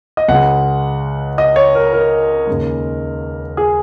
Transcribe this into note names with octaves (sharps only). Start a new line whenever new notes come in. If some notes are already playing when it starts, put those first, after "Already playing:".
D#5
C#2 C#3 G#3 F#5
D#5
C#5
A#4
A#4
D#2 C#3 G#3
G#4